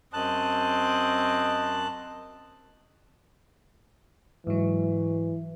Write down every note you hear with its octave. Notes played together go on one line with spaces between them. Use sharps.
F#2 C4 D#5 A5 F#6
G#2 E3 F#3